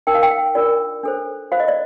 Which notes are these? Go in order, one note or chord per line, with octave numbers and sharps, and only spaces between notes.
D#4 A#4 G5
F5
G5
F5
D4 F4 A#4 D5
D4 A4 C5
F4 C5 F5
D#5
D5